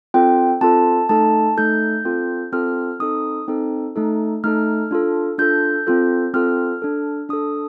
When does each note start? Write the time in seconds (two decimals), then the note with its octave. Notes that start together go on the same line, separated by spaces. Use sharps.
0.14 C4 F4 A4 G5
0.61 C4 F4 A4 A5
1.09 A3 D#4 A4 A5
1.57 A3 D#4 A4 G6
2.05 C4 F4 A4
2.52 C4 F4 A4 F6
3.00 C4 D#4 A4 D#6
3.48 C4 D#4 A4
3.96 A3 D#4 A4
4.44 A3 D#4 A4 F6
4.91 D4 F4 A4
5.38 D4 F4 A4 G6
5.87 C4 F4 A4
6.34 C4 F4 A4 F6
6.82 D4 A4
7.29 D4 A4 D#6